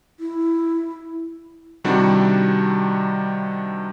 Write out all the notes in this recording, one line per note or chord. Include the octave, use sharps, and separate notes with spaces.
E4
C3 D#3 G3 D4 E4 F#4